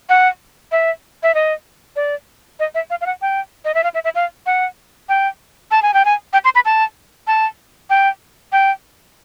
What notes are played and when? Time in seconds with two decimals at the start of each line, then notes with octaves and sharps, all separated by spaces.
0.09 F#5
0.72 E5
1.23 E5
1.34 D#5
1.96 D5
2.60 D#5
2.75 E5
2.90 F5
3.01 F5
3.06 F#5
3.22 G5
3.65 D#5
3.74 E5
3.84 F5
3.94 E5
4.04 E5
4.15 F5
4.46 F#5
5.09 G5
5.71 A5
5.82 G#5
5.94 G5
6.05 G#5
6.33 G5
6.45 C6
6.55 B5
6.65 A5
7.27 A5
7.90 G5
8.52 G5